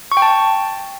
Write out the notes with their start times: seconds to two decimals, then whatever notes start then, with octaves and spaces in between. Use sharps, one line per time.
0.12 C#6
0.17 G5
0.22 A5